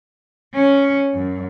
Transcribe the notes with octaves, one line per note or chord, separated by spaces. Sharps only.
C#4
F#2